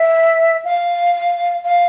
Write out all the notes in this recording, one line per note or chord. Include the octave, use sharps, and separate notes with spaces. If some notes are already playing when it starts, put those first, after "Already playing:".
Already playing: E5
F5
F5